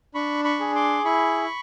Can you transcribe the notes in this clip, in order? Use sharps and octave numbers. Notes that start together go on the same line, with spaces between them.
D4 B5 C#6
B5 C#6
G#4
C6 D6
E4 B5 C#6